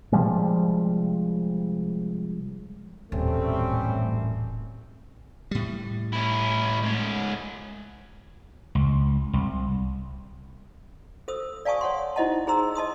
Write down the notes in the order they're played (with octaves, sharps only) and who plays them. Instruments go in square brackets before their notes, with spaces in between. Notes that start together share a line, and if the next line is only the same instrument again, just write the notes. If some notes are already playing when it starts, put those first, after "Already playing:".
[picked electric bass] C3 F3 G3 G#3
[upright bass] D#1 [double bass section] A1 F#2 [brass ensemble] G3 C4 [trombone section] A3 C#4
[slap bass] A2 G3
[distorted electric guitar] C#4 E4
G#2 C#4
[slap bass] C#2
C2
[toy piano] A4 C5 D#6 E6
D5 F5 G#5 A5 C#6 D#6
C#5 F#5 C6
D#4 E4 C5 D#5 F#5 A5
D#4 G#4 C5 A#5 C6 E6
D#5 A5 C6 D#6